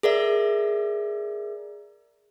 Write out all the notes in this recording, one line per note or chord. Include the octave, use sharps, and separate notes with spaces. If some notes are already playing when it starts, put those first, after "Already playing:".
G#4 A#4 D5 E5